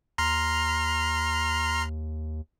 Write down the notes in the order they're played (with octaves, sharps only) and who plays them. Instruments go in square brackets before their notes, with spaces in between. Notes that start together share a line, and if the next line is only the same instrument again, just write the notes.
[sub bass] D#2 [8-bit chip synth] A#5 C6 F6